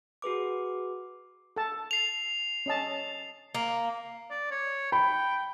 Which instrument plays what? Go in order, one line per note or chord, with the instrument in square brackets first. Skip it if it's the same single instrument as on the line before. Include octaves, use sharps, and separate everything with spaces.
[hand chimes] F#4 G#4 B4 D6
[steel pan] A4 A5
[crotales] C7 F7
[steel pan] C#4 D#5 A5
[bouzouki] A#3
[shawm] D5
C#5
[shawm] G5 [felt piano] B5